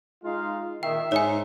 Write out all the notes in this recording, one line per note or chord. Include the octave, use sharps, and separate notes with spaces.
G#3 D#4 F4 F5
A#2 D#3 E5 G5
G#2 D#4 C#5 G#5